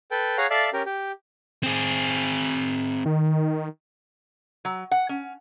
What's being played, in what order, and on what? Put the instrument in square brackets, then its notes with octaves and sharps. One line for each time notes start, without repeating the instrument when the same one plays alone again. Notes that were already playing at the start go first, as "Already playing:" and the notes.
[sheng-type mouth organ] A4 B4 G5
G#4 C#5 F5 F#5 A#5
A4 D5 E5 F5
C#4 G4 A#4
G4
[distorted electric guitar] C4 G#4
[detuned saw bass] D#3
[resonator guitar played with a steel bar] F#3
F#5
C#4